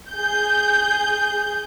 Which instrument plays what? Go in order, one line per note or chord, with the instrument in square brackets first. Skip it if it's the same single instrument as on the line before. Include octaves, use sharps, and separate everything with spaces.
[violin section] G#4 G6